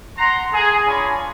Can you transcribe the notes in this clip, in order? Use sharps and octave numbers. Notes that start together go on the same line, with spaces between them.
F#5 A#5 C6
G#4
D4 F4 C#5 G#5 A#5 B5